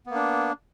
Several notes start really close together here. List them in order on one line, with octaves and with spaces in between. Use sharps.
B3 A#3 D4